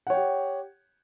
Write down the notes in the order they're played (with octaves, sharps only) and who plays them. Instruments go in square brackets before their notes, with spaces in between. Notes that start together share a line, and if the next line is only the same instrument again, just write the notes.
[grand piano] F#5
C#5
G5
G4